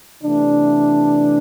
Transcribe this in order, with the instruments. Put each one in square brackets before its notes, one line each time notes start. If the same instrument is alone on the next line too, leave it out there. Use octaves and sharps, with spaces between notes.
[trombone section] C3 E3 A3 D4